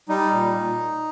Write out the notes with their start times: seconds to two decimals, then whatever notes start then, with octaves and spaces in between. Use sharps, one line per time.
0.09 G3 D#4
0.31 A#2
0.53 A#2